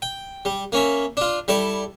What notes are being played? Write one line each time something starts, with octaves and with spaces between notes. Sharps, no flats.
G5
G3
A#3 C#4 E5
D4 F4
G3 E4 A4 D5